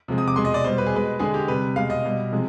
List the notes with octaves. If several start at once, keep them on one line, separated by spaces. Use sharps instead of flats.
C3 F3 G#3
D#6
D6
B2 G#3 C6
D#5
D5
B2 G3 C5
B4
G#4
B2 G#3 B4
D3 G#3 G#4
G4
C3 G3 B4
B2 G#3 F5
D#5
B2 G3
C3 F3 G#3